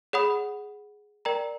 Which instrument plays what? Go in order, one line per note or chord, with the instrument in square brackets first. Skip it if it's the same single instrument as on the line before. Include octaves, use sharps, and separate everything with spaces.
[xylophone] G#4 C#5 F#5 B5 D#6
A#4 D5 G5 A#5